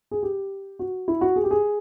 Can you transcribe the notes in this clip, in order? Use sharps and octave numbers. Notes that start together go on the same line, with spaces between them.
G#4
G4
F#4
E4
F#4
G#4
G4
G#4